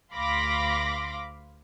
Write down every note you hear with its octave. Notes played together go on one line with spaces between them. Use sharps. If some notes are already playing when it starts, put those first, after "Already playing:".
D2 F5 B5 C6 D6 A#6